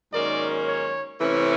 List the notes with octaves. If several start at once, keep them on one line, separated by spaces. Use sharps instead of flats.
G#2 D#3 F#3 A#3 C#4 D5
C#5
C3 E3 A3 C#4